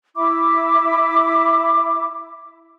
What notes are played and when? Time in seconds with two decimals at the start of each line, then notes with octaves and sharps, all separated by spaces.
0.16 E4 E5 B5 D6